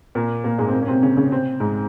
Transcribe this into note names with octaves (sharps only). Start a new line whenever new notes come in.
A#2 A#3
A#2 A#3
G#2 G#3
C4
A#2 A#3
C#4
C3 C4
C#3 C#4
C#3 C#4
C3 C4
G#2 G#3